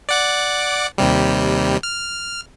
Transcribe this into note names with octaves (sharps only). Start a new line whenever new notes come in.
D5 F#5 D6
D#2 C3 G3
F6